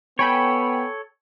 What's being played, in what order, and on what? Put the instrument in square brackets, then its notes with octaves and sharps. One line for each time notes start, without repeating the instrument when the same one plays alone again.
[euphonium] B3 [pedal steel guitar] A4 C#5 [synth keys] G5 G#5 B5